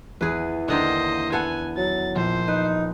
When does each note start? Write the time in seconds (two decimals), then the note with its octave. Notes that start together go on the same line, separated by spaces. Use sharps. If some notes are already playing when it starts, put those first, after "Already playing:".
0.21 E2 G#4 B4
0.68 D3 D#3 A#3 C5 D#5
1.32 B3 A4 F#5 G#5
1.77 F#3 A6
2.16 A#1 C5
2.48 D#4 B4